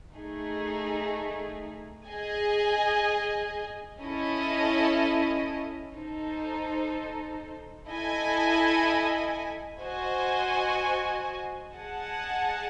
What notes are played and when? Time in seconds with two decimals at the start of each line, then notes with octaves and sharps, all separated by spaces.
0.15 A3 D#4 G#4
2.07 G#4 D#5 G#5
4.01 C#4 E4 A4 D#5
5.94 D#4 A4 C5
7.88 E4 A4 D#5 G#5
9.81 F#4 C5 D#5 G#5
11.74 G#4 D#5 F#5 A5